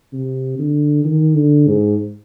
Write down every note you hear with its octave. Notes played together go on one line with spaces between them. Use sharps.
C3
D3
D#3
D3
G#2